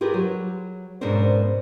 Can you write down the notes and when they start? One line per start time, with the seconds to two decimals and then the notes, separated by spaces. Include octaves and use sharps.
0.01 F4 G4 G#4 A#4 B4
0.14 F#3
1.01 G#2 B2 C#4 D4 A#4 C5